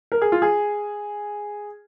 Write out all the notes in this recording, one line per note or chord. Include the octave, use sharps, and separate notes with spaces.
A#4
G#4
F4
G#4